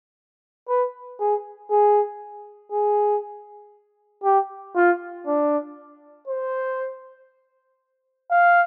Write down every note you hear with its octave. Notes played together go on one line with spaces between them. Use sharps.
B4
G#4
G#4
G#4
G4
F4
D4
C5
F5